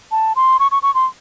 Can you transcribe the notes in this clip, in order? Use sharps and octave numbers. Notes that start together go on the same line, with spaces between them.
A5
C6
C#6
C#6
C#6
C6